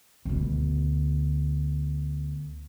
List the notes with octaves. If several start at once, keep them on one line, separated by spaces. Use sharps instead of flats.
D2 B2